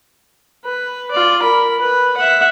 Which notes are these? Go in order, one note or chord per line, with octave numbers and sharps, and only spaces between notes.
B4
F4 D5
A#4 B5
B4
E5 F#5